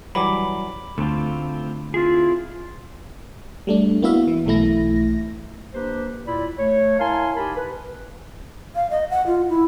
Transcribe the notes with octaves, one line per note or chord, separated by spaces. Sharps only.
E3 F#3 G3 B5 D6
D2 A3 C4 F4
C4 E4 F4 G#4
G3 A3 D4
A#3 B3 E4 F#4 E5 F5
E3
B1 E3 A3 E4 A#6
A#3 D4 G4 B4 C5
D#2 A#2 E4 F4 D5 B5
A3 C#5
E4 A#4 F5 G#5 A5 C6
D#4 G4 A#4 G#5 A5 B5
B4
F5
D#5
F#5
F4
E4